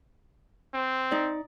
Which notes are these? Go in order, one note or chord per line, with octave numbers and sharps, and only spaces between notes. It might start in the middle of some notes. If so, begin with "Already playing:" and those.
C4
D#4 D5